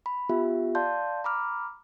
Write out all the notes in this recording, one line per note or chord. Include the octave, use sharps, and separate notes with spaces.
B5
B3 F4 G4 E5
D5 F5 A5 C6 G6
A#5 B5 D6 F6